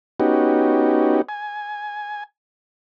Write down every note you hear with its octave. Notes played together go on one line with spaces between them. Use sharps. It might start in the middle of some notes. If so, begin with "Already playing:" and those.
B3 C#4 D#4 F#4 G4
G#5